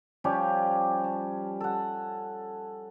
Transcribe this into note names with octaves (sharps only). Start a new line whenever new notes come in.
F3 G3 C#4 G4
A5
A4 F#5